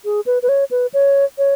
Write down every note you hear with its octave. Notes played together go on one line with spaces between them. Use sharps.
G#4
B4
B4
C#5
B4
C#5
C#5